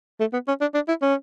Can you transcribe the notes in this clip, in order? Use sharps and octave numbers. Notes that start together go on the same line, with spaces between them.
A3
B3
C#4
D4
D4
E4
C#4